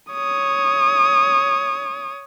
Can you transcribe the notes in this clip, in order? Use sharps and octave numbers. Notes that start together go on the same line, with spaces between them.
C#5 D#6